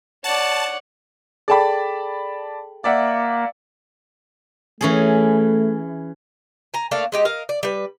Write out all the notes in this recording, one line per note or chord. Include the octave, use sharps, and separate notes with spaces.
C#5 D5 F#5 A5
G#4 A4 D5 G5 A5 B5
A#3 D5 E5 F#5
E3 A3 C#4 G#4
G#5 A#5
A3 A#3 D4 F5
G#3 D#4 G4
A#4 D#5 F5
D5
G3 B4